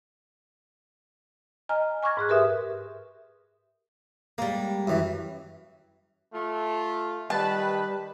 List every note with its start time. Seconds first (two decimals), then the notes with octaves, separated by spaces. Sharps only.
1.69 D#5 G#5 A#5 F6
2.03 G#5 C#6 D6 F6 G#6 A#6
2.17 G#2 G#4 F#6
2.29 G4 A#4 B4 E5 D#6
4.38 G3 G#3 A#3
4.87 F#2 E3
6.33 A3 F4
7.30 D#3 G3 B4 A5